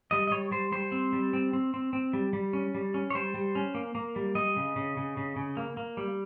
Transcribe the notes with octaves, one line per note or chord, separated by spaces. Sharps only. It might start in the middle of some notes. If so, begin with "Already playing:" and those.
G3 D#5
D#5
G3 C#5
G3 C5
G3 C5
C4
G3
C4
C4
C4
C4
G3
G3
C#4
G3
C#4
C#5
G3 C5
G3
C#4
A#3
A#3
G3
G3 D#5
C#3
C#3
C#3
C#3
C#3
A#3
A#3
G3